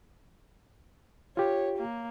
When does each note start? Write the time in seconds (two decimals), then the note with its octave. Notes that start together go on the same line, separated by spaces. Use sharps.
1.37 F4 G4 C#5
1.78 A#3